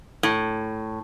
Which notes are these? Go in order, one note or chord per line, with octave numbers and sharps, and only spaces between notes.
A2